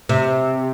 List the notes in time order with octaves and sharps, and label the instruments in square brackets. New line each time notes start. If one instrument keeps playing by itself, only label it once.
[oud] C3